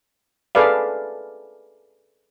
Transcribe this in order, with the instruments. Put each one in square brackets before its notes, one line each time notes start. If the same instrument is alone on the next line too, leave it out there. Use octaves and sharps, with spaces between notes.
[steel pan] G#4 A4 B4 D5 F5